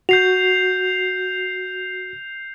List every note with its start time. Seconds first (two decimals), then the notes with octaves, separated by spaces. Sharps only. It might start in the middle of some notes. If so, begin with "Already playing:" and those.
0.09 F#4 G6 C7 F7